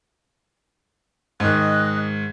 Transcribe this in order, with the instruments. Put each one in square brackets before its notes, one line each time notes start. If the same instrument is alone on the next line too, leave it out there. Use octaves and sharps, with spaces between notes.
[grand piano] G#2 D#3 [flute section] D#5 D#6 F#6